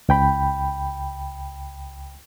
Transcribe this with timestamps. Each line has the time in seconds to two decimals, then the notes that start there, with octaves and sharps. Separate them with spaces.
0.09 C#2 G5 B5